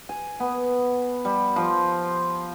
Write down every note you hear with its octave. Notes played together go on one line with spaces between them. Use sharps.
G#5
B3
G3
F3